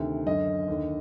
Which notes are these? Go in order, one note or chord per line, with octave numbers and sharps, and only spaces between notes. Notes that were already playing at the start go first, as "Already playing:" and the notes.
Already playing: D2 C3 D#3
F#2 D3 D#5
D#2 D3